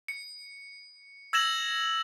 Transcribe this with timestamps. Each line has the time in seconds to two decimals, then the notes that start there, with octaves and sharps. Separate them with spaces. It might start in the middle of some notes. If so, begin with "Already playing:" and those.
0.08 C#7
1.33 E6 G#6 A#6 E7 F#7